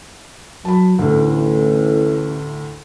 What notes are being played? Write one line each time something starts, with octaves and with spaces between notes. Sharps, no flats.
F#3 A5 B5
A1 D2 A2